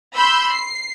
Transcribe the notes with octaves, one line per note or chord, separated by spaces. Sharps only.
B5 C6 E6 G6
C7